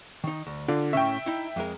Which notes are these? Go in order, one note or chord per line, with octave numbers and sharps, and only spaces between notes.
D#3 D#4
D2
D3 F4 D5
A2 C#3 C#4 E5 G5
D#4 E4
F2 G#3 A#4